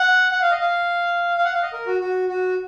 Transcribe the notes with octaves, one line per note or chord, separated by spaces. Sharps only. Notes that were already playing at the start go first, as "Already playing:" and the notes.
Already playing: F#5
F#5
F5
D#5
F5
F5
F#5
F5
D#5
A#4
F#4
F#4
F#4